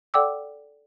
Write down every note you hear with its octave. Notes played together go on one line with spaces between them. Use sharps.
A4 D5 F#5 G5 D6 E6